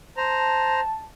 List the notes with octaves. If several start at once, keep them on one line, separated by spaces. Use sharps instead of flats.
C5 A5 A#5